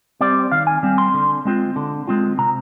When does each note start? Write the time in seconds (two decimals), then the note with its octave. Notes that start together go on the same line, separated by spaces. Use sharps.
0.21 G3 C4 D5
0.52 D#3 F5
0.67 G#5
0.83 G3 C4
0.98 C6
1.14 D3
1.45 G#3 C4 F4
1.76 D3
2.08 G#3 C4 F4
2.38 C3 A#5